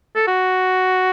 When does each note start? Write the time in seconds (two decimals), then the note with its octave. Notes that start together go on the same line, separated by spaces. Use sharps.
0.16 A4
0.28 F#4